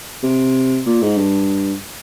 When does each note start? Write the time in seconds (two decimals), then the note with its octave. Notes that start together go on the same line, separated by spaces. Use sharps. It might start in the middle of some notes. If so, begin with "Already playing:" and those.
0.23 C3
0.86 A#2
1.02 G#2
1.17 G2